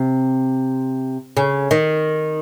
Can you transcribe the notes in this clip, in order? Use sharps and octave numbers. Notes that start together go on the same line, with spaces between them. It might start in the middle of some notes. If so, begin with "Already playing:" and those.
Already playing: C3
C#3
D#3